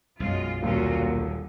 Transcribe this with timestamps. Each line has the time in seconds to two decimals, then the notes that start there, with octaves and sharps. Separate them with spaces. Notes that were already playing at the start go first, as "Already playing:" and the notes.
0.20 B1 F#2 G#3 F4
0.63 D#1 A#2 C#4 F4 F#4
1.02 D3